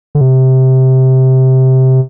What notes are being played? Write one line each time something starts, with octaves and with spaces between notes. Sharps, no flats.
D3
C3